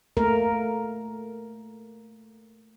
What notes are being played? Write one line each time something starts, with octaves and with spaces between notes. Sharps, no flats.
A3 A#3 A#4